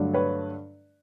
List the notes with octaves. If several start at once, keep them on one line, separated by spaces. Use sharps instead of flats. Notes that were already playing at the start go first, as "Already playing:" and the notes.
Already playing: G2 D3 F#3 A3 D4
B4 C#5